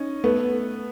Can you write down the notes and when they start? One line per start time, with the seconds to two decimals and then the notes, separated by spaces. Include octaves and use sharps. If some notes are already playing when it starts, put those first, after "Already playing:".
Already playing: C#4 D#4
0.24 A3 B3